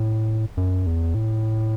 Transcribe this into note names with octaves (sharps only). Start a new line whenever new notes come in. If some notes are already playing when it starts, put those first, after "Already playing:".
Already playing: A2
F#2
E2
A2